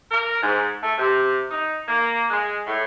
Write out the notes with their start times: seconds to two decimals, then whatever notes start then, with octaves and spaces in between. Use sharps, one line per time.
0.11 A#4
0.41 G#2
0.82 A3
0.98 C3
1.51 D#4
1.88 A#3
2.30 G#3
2.66 A2